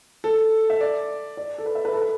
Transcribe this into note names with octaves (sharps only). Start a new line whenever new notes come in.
A4
E5
D5
D5
A4
B4
E5
B4
A4
B4